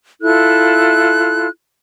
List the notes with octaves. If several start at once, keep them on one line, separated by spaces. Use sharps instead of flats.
E4 F4 A4 F#6